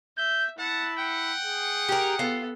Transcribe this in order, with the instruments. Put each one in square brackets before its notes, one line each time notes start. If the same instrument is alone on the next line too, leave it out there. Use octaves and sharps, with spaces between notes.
[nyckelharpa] E5 [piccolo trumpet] G6
[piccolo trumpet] E4 [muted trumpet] F#5 [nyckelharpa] A5
[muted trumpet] F#5 [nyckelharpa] G5
[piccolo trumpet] G#4
[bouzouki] G4 A#4
[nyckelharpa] B3 A4 [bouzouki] F4